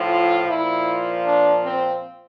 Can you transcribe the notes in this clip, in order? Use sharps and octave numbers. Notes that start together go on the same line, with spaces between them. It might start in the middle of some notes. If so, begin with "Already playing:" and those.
Already playing: A2 F3
F4
A#2 F3 E4
D4
C4